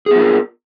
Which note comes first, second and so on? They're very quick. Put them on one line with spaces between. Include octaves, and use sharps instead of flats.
G#4 B3 F4 A#4